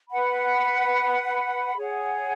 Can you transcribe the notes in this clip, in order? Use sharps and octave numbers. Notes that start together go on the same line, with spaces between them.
B4 F#5 B5
G#4 C#5 F#5